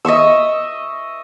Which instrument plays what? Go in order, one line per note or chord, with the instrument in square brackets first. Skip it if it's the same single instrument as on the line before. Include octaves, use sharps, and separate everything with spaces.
[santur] D#5 E5 C#6 E6